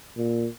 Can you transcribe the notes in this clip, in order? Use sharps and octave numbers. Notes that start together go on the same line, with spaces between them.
A#2